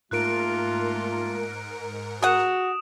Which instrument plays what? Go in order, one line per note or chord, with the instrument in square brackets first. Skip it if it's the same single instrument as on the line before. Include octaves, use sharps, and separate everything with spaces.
[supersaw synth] G#2 A#4 C#7 [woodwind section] A3 A#3 F4 [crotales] F#6 D7
[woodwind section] F#4 [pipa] G#4 F#5 [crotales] D#6 E7